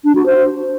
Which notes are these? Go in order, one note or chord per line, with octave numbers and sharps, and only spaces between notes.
D4
F#4
C5